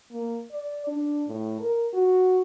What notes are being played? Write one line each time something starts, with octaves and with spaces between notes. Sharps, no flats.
A#3
D5
D4
A2
A#4
F#4